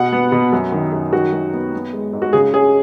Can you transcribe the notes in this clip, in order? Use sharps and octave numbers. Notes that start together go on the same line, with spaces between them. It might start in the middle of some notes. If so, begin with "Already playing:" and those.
Already playing: B2 F#5
B3
B2
F#2
D#3
F#2
D#3 F#4
F#2
B3
B3
G#3
G#2
F#4
C#3 G#4
C#4 G#4